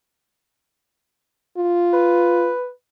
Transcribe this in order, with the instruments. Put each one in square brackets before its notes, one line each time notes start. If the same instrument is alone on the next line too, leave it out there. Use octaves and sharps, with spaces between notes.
[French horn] F4
[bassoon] B4